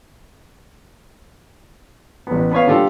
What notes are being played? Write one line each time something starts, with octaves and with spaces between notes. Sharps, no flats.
A1 B3
B3 B4 C#5 F5
D3 G3 F4 G4 A4